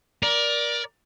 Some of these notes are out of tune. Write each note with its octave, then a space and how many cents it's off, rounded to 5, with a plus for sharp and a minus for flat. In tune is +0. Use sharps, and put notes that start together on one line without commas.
A#4 +25 D5 +0